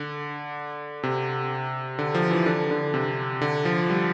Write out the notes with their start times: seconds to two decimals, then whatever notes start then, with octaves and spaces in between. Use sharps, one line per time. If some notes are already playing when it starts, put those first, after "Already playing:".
Already playing: D3
1.03 C3
1.99 D3
2.15 F3
2.31 E3
2.46 D3
2.71 D3
2.94 C3
3.41 D3
3.65 F3
3.90 G3